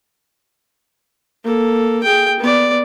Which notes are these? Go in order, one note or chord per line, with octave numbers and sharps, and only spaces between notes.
A#3 A4
G#4 G5
B3 D5